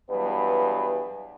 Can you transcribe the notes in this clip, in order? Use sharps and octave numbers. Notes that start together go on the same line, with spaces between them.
G2 E3 F#3 B3 G#4 B4